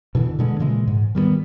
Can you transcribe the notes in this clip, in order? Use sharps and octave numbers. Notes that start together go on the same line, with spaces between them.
B2 D3 E3
B2 D3 G#3
A#2 C#3 E3 G#3
G#2
D#3 G3 G#3 B3